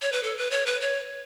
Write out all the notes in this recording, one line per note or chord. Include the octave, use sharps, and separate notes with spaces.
C#5
B4
A4
B4
C#5
B4
C#5